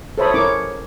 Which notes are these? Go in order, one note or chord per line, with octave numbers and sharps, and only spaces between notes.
A4 C5 C#5 E5 B5 D#6
C#4 E4 A#4 C#5 D6